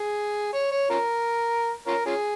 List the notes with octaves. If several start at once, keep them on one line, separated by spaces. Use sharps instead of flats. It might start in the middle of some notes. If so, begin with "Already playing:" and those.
Already playing: G#4
C#5
C#5
C#4 F4 A#4
C#4 F4 A#4
C#4 F4 G#4